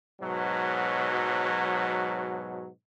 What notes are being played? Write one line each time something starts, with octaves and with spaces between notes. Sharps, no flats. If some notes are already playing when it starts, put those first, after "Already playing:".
G#2 B2 F#3